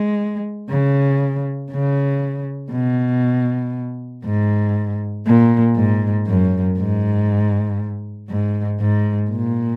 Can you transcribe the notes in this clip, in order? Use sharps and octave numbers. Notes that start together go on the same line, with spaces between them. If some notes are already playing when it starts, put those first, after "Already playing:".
Already playing: G#3
C#3
C#3
B2
G#2
A#2
G#2
F#2
G#2
G#2
G#2
A#2